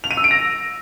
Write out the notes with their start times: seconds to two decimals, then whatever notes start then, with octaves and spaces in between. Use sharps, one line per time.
0.04 F7
0.11 D#7
0.17 E6
0.24 D7
0.31 A#6